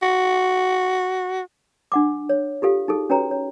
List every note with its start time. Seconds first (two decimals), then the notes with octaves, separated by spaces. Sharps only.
0.02 F#4
1.92 D4 F#5 D6
2.29 C#5
2.62 F4 G4 A4 F5
2.88 D#4 G#4 A4
3.10 C#4 F#4 B4 C#5 G5 A#5
3.31 C#5